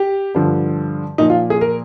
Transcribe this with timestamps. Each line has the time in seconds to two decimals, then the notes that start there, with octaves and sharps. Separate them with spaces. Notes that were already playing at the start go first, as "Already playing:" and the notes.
Already playing: G4
0.35 G2 D3 F3
1.18 A#2 F3 D#4
1.30 F4
1.50 G#4
1.61 A#4